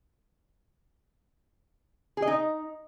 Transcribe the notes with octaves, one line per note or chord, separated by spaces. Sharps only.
G#4
D#5
D#4